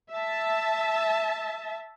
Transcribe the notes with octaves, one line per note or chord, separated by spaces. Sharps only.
E5 A5